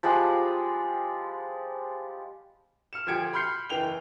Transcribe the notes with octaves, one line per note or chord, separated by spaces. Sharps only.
F3 G3 G#3 F#5
F6 C#7 E7
D2 F3 G4 G#6 C#7 D7
B5 C6 F6 G6 C7 C#7
F#1 E2 E3 G5 F7 G7